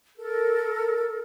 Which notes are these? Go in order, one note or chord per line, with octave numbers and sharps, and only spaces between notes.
A4 A#4